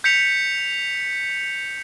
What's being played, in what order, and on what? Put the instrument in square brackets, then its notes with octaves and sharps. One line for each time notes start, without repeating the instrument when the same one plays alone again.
[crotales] G6 B6 C#7 F7